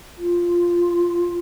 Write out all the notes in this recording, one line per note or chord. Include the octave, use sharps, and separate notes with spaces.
F4